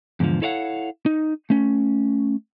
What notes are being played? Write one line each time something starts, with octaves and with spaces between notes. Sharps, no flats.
E2 G#2 D3 F3
E4 A4 C#5 D5 F5 F#5
D#4
A3 C#4